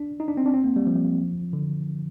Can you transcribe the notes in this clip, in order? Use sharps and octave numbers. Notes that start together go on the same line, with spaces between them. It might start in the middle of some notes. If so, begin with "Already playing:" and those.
Already playing: D4
D#4
D4
C4
D4
C4
A#3
G3
F3
D3